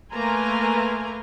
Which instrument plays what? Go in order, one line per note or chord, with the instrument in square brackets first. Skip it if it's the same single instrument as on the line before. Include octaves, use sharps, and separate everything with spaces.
[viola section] A3 A#3 B4 G#5 A#5 C6